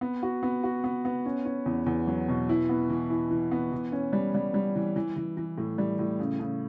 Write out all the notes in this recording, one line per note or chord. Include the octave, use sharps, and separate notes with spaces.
B3
F#4
B3
F#4
B3
B3
C#4
C#4
E2
E2
F#3
B2
E4
B3
E3
E4
E3
B3
E3
C#4
G3
G3
G3
E3
E3
E3
E3
A2
G3
A2
C#3
C#3